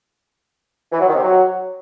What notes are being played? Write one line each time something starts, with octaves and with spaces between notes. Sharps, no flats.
E3
F#3
D#3
C3
F#3